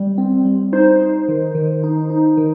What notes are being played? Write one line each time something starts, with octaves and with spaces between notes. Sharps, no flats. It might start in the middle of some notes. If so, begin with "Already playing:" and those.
Already playing: G3
C4
G3
D#4 C5
D#4
D#3
D#3
D#4
D#4
D#3